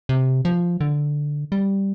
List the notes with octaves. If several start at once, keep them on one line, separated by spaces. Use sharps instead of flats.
C3
F3
D3
G3